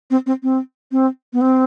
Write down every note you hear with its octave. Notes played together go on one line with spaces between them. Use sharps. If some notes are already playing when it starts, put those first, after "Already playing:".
C4
C4
C4
C4
B3
C4